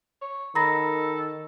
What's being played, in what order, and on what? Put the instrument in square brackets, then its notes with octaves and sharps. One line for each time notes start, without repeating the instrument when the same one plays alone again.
[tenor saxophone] C#5
[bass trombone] D#3 [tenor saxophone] A4 [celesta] A#5 B5 A#6